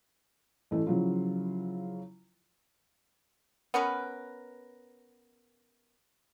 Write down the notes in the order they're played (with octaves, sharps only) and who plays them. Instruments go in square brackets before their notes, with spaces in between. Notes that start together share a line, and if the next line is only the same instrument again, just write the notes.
[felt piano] A1 E3 A3
C#3 F3 F#3 E4 F4
[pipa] B3 C#4 A#4 B4